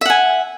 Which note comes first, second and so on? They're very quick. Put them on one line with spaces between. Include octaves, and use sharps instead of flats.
E5 F#5 G#5